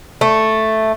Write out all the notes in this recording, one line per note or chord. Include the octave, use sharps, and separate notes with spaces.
A3